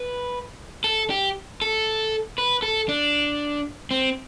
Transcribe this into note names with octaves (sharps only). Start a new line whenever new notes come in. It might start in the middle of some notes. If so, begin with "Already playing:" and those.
Already playing: B4
A4
G4
A4
B4
A4
D4
C4